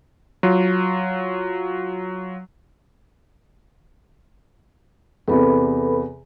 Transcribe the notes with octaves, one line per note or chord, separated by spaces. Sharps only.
F#3 F4
E2 C3 A4 B4 B5